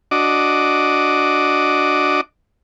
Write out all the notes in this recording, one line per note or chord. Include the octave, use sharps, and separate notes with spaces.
D4 F#4 D#5 D6